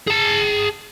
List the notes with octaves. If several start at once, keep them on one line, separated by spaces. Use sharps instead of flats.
G#4 A5